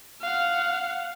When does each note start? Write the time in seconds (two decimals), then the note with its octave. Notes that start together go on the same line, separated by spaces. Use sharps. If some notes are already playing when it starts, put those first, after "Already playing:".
0.21 F5 F#5